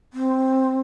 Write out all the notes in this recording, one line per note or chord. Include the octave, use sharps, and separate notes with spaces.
C4